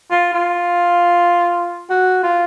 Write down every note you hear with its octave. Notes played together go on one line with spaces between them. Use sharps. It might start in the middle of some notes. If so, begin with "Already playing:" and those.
F4
F4
F#4
F4